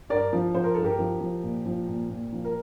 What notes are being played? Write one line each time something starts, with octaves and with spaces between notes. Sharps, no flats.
G2 A#4 D5
F3
F3 C5
A#4
G2 A4
G4 A#4
F3
F3
A#2
F3
A#2
A#2
F3
A#4